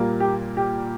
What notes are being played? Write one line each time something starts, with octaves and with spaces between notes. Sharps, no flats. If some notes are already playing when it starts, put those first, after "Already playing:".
Already playing: A#2 G3 A#3
G4
G4